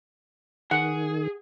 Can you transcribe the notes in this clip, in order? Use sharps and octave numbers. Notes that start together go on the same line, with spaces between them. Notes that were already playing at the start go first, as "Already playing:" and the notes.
D#3 G#4 F#5